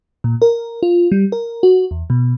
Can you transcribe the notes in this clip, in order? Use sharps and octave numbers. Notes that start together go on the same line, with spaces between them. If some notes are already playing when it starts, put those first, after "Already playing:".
A#2
A#4
F4
G3
A#4
F#4
E2
B2